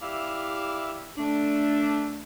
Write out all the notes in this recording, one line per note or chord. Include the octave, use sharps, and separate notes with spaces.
E4 G4 D5 E5 F5
A3 D4